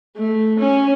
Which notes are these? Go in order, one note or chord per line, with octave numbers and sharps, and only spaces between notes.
A3
C#4